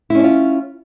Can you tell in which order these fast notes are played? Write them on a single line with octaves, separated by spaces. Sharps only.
E4 C#4 D4 F4